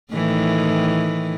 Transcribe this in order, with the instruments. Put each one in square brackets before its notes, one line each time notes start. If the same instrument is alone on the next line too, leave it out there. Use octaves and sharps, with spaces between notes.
[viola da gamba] A2 D#3 E3